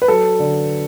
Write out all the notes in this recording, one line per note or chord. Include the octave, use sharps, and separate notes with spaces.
B4
F#3 A4
D3